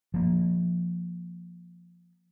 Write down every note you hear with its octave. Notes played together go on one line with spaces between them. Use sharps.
F3 A#3